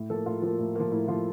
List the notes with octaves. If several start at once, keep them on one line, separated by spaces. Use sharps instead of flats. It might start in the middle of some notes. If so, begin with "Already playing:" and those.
Already playing: A2
F3 A#3 A4
A2 F4
F3 A#3
A2
F3 A#3
A2 E4
F3 A#3 F4